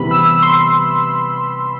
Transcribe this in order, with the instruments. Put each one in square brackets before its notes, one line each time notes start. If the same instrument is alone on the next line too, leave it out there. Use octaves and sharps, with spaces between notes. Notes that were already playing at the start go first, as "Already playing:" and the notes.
Already playing: [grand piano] C3 E3 G3 B3 [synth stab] B5
[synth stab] E6
C6